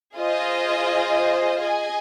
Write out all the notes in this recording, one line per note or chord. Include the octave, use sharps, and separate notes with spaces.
F4 G#4 C5 D#5
G#4 D#5 G#5